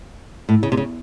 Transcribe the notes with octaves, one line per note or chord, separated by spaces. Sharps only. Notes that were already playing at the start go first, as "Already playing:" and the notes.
A2
C#3
C3
C#3